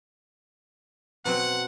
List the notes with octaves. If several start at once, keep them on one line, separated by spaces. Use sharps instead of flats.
B2 F#3 C4 F#5